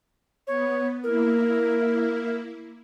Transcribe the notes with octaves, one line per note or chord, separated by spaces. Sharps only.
B3 C#5
A#3 E4 A#4